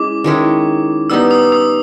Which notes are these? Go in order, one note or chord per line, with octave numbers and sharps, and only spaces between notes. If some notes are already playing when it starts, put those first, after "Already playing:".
Already playing: G#3 C#4 E4 D6
D#3 G#3 C#4 E4
G3 B3 D#4 E6
D#6
D#6